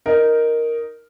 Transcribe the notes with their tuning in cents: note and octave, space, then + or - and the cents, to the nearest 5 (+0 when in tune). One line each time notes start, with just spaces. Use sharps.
D#4 +0 A#4 +0